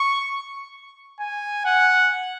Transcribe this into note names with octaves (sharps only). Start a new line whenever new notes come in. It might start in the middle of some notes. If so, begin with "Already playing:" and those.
Already playing: C#6
G#5
F#5